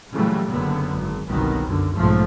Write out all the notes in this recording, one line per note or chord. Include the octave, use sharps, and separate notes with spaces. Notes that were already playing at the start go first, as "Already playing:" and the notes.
A#2 C#3 E3 F#3 G3 A3
F#1 F#2 D3 B3
G#1
G1 C2 B2 D#3 F#3 B3
F#2 D3
B1 G#2 F3 A3